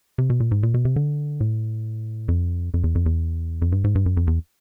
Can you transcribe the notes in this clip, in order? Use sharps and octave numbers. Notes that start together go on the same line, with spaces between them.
C3
B2
A#2
G#2
A#2
B2
C3
D3
A2
F2
F2
E2
F2
E2
F2
G2
G#2
G2
F#2
F2
E2